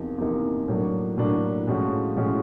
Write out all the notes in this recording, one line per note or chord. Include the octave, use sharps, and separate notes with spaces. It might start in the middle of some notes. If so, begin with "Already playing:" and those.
Already playing: E2 C3 F3 A#3 D#4
E2 C3 F3 A#3 D#4
A2 F#3 A#3 D4
A2 F#3 A#3 D4
A2 F3 G#3 C#4 F#4
A2 F3 G#3 C#4 F#4